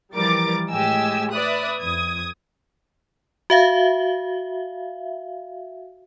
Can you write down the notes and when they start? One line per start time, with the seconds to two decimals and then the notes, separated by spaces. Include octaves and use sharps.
0.14 E3 F3 G3 A#4 D6 A6
0.70 A2 G#3 G4 D#5 G#5 E6
1.31 B4 D5 E5 D#6 F#6
1.79 F2 D#6 G#6
3.50 F#4 E5 F5